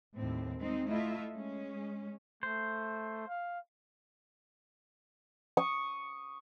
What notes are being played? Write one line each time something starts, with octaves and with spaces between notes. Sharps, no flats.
D#2 A2 C4
G#3 C4 D#4
A3 E4 F4 D#5 E5
G#3 C#4
A3 C5
F5
C#6 D#6